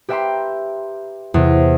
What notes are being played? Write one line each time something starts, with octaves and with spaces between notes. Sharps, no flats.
G4 B4 E5 G5 A#5 C6
E2 C3